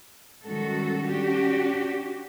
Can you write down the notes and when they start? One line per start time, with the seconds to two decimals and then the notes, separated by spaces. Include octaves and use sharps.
0.44 D#3 G3 G#3 C#4 F#4 A4
1.05 C#4 D4 F#4 G4